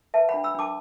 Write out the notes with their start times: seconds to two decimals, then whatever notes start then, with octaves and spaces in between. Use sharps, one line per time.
0.14 B4 E5 A5
0.29 F#5 B5
0.34 D4
0.44 B5 E6
0.55 D4 A5 D6